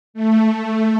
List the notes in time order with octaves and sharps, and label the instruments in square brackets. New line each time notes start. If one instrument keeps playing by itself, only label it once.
[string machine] A3